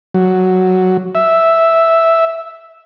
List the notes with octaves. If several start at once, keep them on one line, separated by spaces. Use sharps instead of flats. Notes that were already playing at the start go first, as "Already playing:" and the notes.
F#3
E5